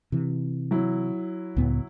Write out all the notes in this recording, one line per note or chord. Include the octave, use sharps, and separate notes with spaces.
C3 E3
F#3 E4
C#2 A2 B3